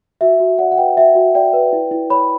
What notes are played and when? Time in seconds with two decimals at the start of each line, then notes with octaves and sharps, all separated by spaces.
0.21 F#4 E5
0.40 F#4
0.58 D5 F#5
0.72 F#5
0.78 B4 G5
0.97 F#4 E5
1.15 F#4
1.35 D5 G5
1.53 B4
1.73 E4
1.91 E4
2.10 C#5 B5